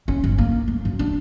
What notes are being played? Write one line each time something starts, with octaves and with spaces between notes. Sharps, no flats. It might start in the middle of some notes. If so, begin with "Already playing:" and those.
C#4
G1
A#3
A3
F#2
D4